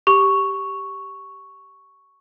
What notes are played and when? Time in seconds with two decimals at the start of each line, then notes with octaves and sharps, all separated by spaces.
0.07 G4 C#6